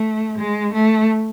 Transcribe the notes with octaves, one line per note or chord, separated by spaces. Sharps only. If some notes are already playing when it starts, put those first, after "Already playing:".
Already playing: A3
G#3
A3